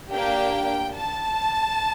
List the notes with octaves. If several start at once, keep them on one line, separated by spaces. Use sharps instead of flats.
A#3 D4 G4 G5
A5